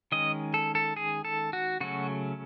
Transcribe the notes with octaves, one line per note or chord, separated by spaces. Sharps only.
D#3 G#3 C#4 D#5
A4
A4
G#4
A4
F#4
C#3 F#3 A3 C#4 F#4